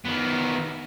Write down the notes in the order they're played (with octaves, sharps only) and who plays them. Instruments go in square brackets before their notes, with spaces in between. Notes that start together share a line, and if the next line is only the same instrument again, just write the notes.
[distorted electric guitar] D#3 B3